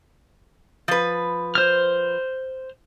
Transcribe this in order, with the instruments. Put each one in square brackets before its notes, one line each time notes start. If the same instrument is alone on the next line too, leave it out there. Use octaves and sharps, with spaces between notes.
[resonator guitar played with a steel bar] F3 B4
[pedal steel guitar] C5 F6